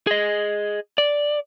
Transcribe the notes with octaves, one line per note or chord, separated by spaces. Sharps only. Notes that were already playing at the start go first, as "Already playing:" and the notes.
G#4 D#5
D5